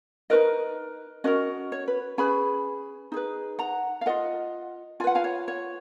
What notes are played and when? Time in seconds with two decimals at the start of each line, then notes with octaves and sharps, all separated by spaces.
0.30 D#4 F#4 A#4 B4 D#5
1.24 C#4 F#4 A#4 B4 D#5
1.72 C#5
1.88 B4
2.18 C#4 G#4 B4 G#5 B5
3.12 D#4 G#4 B4
3.59 F#5 A#5
4.01 F5
4.06 F4 A#4 D#5 F#5
5.00 F4 G#5
5.04 B4 F#5
5.15 F5 G#5
5.24 C#5
5.48 C#5